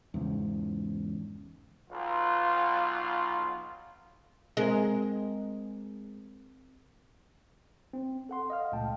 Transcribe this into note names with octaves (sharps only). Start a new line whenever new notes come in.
E2 G#2 C#3
B1 F4
G#3 C4 G#4 A#4
C4
A4 F#5 C6
D#5 F5 F6
C#2 A#2 A3 G5 A5